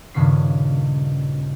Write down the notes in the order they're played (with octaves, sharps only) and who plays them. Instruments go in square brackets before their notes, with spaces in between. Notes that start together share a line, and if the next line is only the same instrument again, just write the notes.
[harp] D#1 G2 C#3 C#4 B6 C7